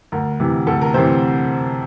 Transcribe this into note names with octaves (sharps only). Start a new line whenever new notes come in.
D2 A#4
C3 E3
D2 A4
A#4
C3 E3 C4 C5